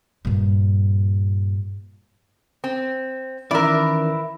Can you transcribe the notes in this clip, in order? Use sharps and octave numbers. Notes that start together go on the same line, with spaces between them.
G2 A#2
C4
D#3 E3 C#4 E4 A#4 B4 D5 E5